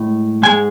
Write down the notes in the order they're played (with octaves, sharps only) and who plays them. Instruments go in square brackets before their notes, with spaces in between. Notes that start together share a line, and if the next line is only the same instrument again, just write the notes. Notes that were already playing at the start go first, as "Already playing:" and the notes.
Already playing: [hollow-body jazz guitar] A2 G#3
G#2 G#3 G#5